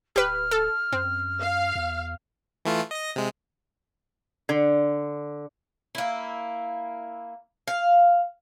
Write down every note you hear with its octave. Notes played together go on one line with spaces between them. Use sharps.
D1 G4 B4 F6
A4
F#2 C4
F5
E2
E3 A3 F4
D#5 A#6
C3 G#3
D3
A#3 E4
F5